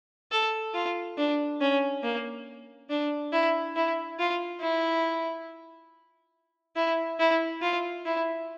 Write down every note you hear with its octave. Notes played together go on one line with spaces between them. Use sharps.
A4
F4
D4
C#4
A#3
D4
E4
E4
F4
E4
E4
E4
F4
E4